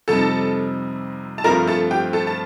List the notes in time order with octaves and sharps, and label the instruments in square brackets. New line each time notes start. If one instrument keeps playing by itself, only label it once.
[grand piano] F2 C3 G3 C4 D#4 [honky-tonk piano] A4 A5
[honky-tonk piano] A5
[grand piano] G2 F3 A3 C4 F4 [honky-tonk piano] A#4 A#5
[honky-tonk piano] A4 A5
G4 G5
A4 A5
A5